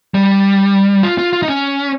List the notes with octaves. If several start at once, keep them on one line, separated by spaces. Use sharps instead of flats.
G3
F4
F4
F4
D#4
C#4